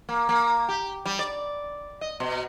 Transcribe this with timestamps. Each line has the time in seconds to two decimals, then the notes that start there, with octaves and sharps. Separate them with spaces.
0.09 A#3
0.29 A#3
0.68 G4
1.06 G3
1.19 D5
2.01 D#5
2.20 B2